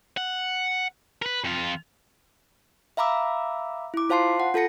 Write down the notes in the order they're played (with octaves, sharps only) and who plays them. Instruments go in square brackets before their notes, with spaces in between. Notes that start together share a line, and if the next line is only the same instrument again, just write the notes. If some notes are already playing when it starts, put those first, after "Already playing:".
[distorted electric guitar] F#5
A#4 B4
F2 F4
[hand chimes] E5 F5 A#5 B5 D6 E6
E4 D6
F4 C5 F5 A5 C6 C7
F#5
F4 A4 A5 A#6 C#7